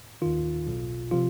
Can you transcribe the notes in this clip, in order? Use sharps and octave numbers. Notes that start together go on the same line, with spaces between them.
D#2 D#3 F4
B1 B2
C3 F3 F4